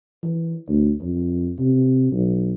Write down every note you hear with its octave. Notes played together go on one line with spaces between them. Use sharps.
E3
D2
F2
C3
B1